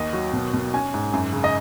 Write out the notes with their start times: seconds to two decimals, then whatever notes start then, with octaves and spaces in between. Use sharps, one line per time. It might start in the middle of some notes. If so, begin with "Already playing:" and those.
Already playing: D#2 D#5
0.13 F#3
0.33 B2
0.53 B2
0.74 C#4 G#5
0.94 G#2
1.13 F#2
1.33 C#3
1.44 D#5